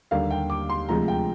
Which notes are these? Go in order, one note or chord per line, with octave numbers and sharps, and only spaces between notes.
D#2 D3 G3 A#3 F5
G5
D6
C6
D2 C3 F3 G#3 A#5
G5